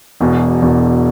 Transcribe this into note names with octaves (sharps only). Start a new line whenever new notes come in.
E1 E2 B2
E1 E2 B2